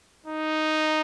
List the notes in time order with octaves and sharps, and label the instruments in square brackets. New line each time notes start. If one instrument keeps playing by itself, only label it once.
[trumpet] D#4